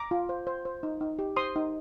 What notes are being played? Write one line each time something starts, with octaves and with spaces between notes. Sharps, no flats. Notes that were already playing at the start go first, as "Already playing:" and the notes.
Already playing: A#5 D6
F4
C5
C5
C5
D#4
D#4
G4
C5 C6 D#6
D#4